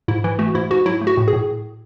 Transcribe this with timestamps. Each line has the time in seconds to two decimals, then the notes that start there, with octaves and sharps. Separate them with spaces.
0.08 G#2 E4
0.24 E3 E4
0.39 A3 F#4
0.55 G#2 E4
0.70 G#2 F#4
0.86 F#3 E4
1.01 A3
1.07 F#4
1.17 A2
1.28 G#4
1.33 A2